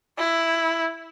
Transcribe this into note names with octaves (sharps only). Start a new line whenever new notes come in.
E4